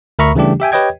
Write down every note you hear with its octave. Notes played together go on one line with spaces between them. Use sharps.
D2 A#4 E5 A#5 B5 C#6
C#3 E3 G3 A3 D4 G4
G4 E5 G5 G#5
G4 B4 C#5 D#5 G5 G#6